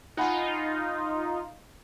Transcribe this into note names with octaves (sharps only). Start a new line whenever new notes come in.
D#4 F4 F#5 G#5 B5